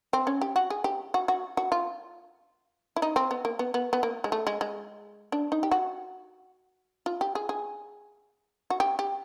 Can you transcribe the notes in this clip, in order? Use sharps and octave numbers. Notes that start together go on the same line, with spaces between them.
C4
C#4
G4
F#4
G#4
G4
F#4
F#4
F#4
F4
E4
D#4
C4
B3
A#3
B3
B3
B3
A#3
G#3
A3
G#3
G#3
D4
D#4
G4
F#4
F4
G4
G#4
G#4
F#4
G4
G4